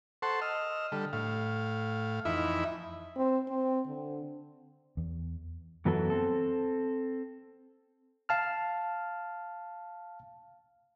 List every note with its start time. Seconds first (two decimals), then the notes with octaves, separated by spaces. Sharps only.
0.22 A4 C5 F#5 A5 C6 C#6
0.41 D#5 E6 F6
0.92 D3 G3 A4
1.13 A2 F5
2.25 F2 E3 D#4 E4 E5 B5
3.17 C4
3.49 C4
3.86 D3
4.97 E2
5.85 F#2 E3 F#3 B3 E4 A4
6.10 C4 A4
8.29 F5 A5 F6